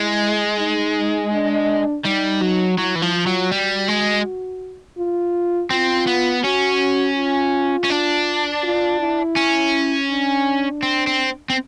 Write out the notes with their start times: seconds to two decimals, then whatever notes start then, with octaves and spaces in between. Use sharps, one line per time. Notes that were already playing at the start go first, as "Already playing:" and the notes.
Already playing: G#3 E4
0.58 D#4
1.32 D4
2.05 G3 D#4
2.42 F#3
2.78 F#3 E4
2.95 E3
3.02 F3
3.15 F4
3.27 F#3
3.51 G3 F#4
3.88 G#3
4.98 F4
5.70 C4 F4
6.07 B3
6.44 C#4 F#4
7.17 F4
7.84 C#4
7.90 D4
8.63 F4
9.00 E4
9.36 C#4
10.10 D4
10.83 C4
11.07 C4
11.50 C4